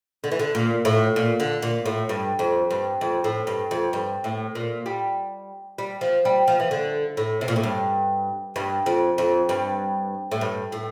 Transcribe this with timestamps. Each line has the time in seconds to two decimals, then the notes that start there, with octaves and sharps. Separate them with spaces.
0.24 D3
0.31 E3
0.39 D3
0.55 A#2
0.85 A2
1.16 A#2
1.40 D3
1.62 A#2
1.86 A2
2.09 G2
2.39 F2
2.71 G2
3.01 F2
3.24 A2
3.47 G2
3.71 F2
3.93 G2
4.24 A2
4.55 A#2
4.86 G3
5.78 G3
6.01 F3
6.25 G3
6.48 F3
6.60 E3
6.71 D3
7.17 A2
7.41 C3
7.48 A#2
7.56 A2
7.63 G2
8.56 G2
8.86 F2
9.18 F2
9.49 G2
10.31 A2
10.41 G2
10.72 A2